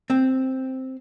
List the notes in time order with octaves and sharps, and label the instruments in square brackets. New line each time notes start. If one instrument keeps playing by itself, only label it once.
[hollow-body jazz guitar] C4